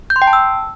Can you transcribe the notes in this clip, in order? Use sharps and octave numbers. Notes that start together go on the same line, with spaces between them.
G6
C6
G5
A5
E6